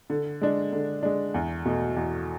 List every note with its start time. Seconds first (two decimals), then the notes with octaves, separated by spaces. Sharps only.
0.10 D3
0.41 G#3 D4
0.73 D3
1.03 G#3 D4
1.34 E2
1.66 B2 A3
1.96 E2